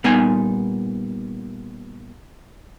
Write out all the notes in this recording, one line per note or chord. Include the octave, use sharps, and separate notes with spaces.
A#2 G3 B3 D#4 G#5 C6